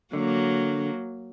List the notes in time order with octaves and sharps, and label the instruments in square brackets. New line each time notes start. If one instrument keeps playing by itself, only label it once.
[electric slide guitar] D3 [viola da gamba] F#3 A#3